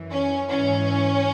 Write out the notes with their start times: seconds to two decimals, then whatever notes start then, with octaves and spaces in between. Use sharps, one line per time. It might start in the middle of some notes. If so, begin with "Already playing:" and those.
Already playing: F#2 E3
0.11 C#4
0.49 G#2 E3 C#4